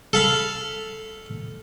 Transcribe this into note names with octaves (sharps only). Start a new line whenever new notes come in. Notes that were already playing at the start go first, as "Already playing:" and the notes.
A4 F5 B5